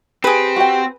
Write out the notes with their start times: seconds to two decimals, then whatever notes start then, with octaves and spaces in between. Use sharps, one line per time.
0.24 C4 G4 G#4 B4
0.56 F#4 G5